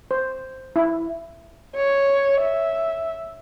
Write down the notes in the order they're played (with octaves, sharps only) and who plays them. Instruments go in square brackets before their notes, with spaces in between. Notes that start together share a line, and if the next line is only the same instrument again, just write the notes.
[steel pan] C5
E4
[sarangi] C#5
E5